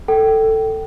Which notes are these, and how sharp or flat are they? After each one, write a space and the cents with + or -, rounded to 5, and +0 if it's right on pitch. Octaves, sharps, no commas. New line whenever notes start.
A4 +10 G5 -20